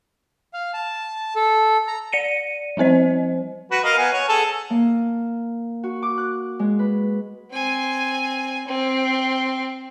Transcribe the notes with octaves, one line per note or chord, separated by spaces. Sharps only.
F5
A5
A4
A#5
D5 C#7 D#7
F3 G3 C4 C5 D#5
F#4 B4
A#4 D#5 F5
B3 F#5 G#5
C#5 F#5
G#4 A4 A5
A#3
F#4
D6
F#6
G#3
B4
C4 G#5
C4